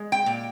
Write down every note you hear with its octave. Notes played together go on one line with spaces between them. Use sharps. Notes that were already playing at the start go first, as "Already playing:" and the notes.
Already playing: G#3
G5
A#2